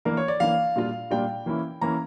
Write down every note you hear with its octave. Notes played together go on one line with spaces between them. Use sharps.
E3 A#3 D4 A#4
C#5
D5
E3 A#3 D4 F5
A#2 G3 D4 F4
A#2 G3 D4 F4 G5
E3 A#3 C#4 E4
E3 A#3 C#4 E4 A#5